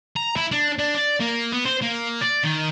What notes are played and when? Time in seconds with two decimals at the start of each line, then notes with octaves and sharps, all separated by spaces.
0.16 A#5
0.37 E4
0.52 D4
0.79 D4
0.95 D5
1.20 A#3
1.52 B3
1.65 C5
1.82 A#3
2.21 D5
2.44 D#3